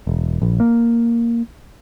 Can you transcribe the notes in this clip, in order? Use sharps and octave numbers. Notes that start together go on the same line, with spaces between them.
E1
A#1
A#3